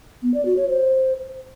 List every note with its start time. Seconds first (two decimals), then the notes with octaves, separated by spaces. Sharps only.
0.23 B3
0.34 D5
0.45 F#4
0.57 C#5
0.68 C5